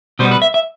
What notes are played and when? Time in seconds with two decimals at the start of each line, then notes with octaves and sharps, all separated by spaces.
0.19 B2 G3 B3 C5
0.31 B4
0.42 E5
0.54 E5